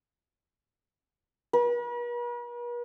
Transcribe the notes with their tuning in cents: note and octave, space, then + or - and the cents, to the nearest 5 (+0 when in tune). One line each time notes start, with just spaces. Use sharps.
B4 -45